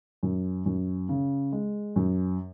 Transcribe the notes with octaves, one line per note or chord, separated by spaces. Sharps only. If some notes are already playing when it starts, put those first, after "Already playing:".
F#2
F#2
C#3
G#3
F#2